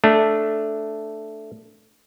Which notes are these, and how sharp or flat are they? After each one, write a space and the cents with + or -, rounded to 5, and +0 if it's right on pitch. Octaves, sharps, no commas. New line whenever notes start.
A3 +0 D4 +0